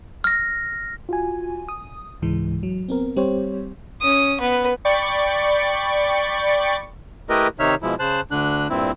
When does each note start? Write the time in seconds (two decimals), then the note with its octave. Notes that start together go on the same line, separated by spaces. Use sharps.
0.24 F6 A#6
1.09 F4 F#4 G#5
1.68 D#6
2.22 C#2 G#2 E3 G#3
2.63 F#3
2.88 B3 C4 A#4
3.16 G3 C4 G4 C5 C#5
4.01 C#4 D#6
4.40 B3 B4
4.85 D5 G5 B5 C#6 A6 C#7
7.29 A3 E4 G4 A#4 B4 D#5
7.59 C3 D#3 D#4 C#5 E5 F6
7.83 B2 F3 G#3 E4
8.00 C#3 C5 A5 F#6
8.31 D2 D3 D4 F#6
8.70 G2 A#2 C4 E4